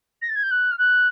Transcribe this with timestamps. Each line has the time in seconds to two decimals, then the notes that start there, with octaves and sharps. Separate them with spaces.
0.21 A#6
0.29 A6
0.35 G#6
0.43 G6
0.51 F#6
0.71 F6
0.78 F#6